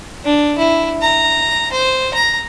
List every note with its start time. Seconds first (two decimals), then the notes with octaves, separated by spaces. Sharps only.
0.24 D4
0.58 E4
1.02 A#5
1.72 C5
2.14 A#5